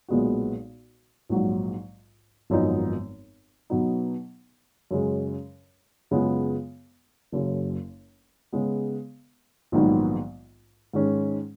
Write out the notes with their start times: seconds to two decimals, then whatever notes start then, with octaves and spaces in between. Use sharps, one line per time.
0.08 B1 A#2 G#3 B3 F#4
1.29 A#1 G#2 F#3
2.50 G#1 F#2 F3 B3 D#4
3.70 B2 F#3 B3 D#4
4.91 F#2 C#3 G#3 C#4
6.11 F#2 C#3 G#3 B3 F4
7.32 F#1 F#2 C#3
8.53 C#3 G#3 B3
9.72 A#1 G#2 D#3 F#3 B3
10.93 G#2 D#3 G#3 C#4